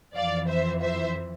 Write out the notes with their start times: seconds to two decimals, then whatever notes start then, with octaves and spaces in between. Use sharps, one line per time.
0.15 F2 E3 D5 F5
0.48 C5 E5
0.81 C5 E5